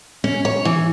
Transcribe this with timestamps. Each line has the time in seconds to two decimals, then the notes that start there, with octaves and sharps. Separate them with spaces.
0.24 C#4
0.45 C#5
0.65 E3